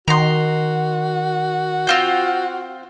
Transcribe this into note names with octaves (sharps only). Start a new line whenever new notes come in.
D#3 F#4 A#5 C6
C4 F4 G5